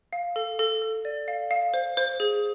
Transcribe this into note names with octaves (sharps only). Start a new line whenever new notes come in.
F5
A4
A4
A4
D5
F5
F5
C5
C5
G#4